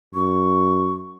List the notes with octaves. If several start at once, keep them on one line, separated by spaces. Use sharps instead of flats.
F#2 C#6